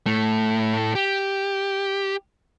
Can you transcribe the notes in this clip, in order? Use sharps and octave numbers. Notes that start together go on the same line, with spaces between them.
A2 A3
G4